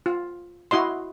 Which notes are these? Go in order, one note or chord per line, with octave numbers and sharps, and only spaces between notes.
F4
E4 F#4 D#5 C6